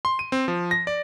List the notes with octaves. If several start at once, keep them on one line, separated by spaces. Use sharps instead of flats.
C6
D#7
C4
F3
A#6
D5